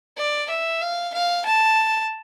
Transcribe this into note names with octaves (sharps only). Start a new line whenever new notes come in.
D5
E5
F5
F5
A5